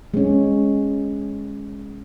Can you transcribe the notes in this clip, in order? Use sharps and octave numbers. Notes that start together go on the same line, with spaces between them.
G#3 C#4